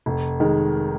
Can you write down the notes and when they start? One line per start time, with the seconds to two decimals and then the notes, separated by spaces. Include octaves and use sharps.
0.06 F1
0.40 D#3 G#3